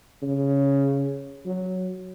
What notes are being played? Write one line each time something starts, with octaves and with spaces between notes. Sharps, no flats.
C#3
F#3